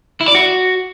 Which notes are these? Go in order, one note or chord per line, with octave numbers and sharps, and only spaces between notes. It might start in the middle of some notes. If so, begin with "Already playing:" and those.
E4
D5
F#4